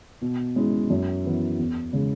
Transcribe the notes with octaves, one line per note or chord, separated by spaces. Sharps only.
B2
G#3 C#4 E4
F#2
E3 B3 E4
E2
C#3 G#3